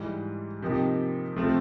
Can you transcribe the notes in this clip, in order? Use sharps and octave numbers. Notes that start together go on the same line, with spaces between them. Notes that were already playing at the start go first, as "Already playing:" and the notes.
Already playing: G#2 E3 G3
C3 F3 A#3 D#4 G4
C3 F3 A3 C4